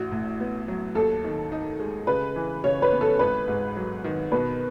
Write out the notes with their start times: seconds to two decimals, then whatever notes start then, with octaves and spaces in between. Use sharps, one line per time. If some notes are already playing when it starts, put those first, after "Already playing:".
Already playing: A1 F#4
0.11 A2
0.40 B3
0.68 F#3
0.95 D#2 A4
1.24 D#3
1.52 D#4
1.80 G#3
2.07 C#3 B4
2.36 E3
2.64 C#3 C#5
2.82 B4
2.92 B3
3.01 A4
3.19 G#1 B4
3.48 G#2
3.76 F#3
4.04 D#3
4.32 B2 B4